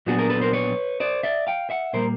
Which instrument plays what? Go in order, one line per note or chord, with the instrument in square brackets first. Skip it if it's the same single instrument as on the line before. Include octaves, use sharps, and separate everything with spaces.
[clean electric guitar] A#2 F#3 B3 D4 F#4 G#4
G#4 A#4
A4 B4
A#4 C5
B4 C#5
C5 D5
D5 E5
F5 G5
E5 F#5
A#2 G3 A#3 A#4 C5